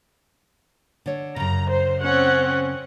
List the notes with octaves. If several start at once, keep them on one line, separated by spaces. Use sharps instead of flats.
D3 C#5
F#2 C#3 A#5
C5
C4 C#4 F#5